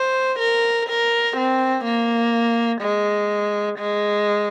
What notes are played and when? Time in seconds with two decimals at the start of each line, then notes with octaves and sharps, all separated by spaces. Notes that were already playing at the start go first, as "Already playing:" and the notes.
Already playing: C5
0.39 A#4
0.89 A#4
1.37 C4
1.85 A#3
2.81 G#3
3.79 G#3